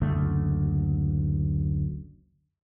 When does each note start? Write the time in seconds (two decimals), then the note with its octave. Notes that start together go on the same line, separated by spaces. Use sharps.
0.02 F#1 D2 A3